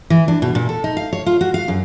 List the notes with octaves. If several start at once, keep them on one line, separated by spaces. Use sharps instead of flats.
E3
D4
B2
A#2
A4
D#4
F5
C#5
F4
F#4
F5
F#2